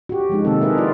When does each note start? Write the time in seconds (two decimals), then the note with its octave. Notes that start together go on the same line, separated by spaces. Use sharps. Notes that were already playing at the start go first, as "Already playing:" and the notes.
0.09 F#4 G4
0.30 F3 G#3 D#4
0.45 C3 D#3 A#3 C4 D#4 A4
0.61 D#4 E4 G#4 A#4 B4 E5
0.78 F4 D5